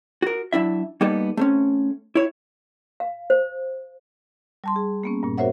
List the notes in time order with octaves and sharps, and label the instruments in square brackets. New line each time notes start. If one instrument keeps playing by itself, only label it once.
[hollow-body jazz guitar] F#4 A#4
F#3 D4 E4 E5
G3 A#3 B3 D#4 A4
A3 C4 C#4
E4 C#5
[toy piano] F5
C5
[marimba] G3 A5 C6
G#4
A#3 B3 C#4
G2 A#2
F#4 A#4 C5 C#5 E5 F#5